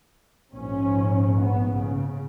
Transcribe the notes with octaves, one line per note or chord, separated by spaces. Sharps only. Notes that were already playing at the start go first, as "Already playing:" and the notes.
A#1 G#2 C#4
B3
C#3